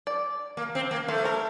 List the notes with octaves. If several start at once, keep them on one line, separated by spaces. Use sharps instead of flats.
D5
A#3
C4
A#3
A3 C5
A#4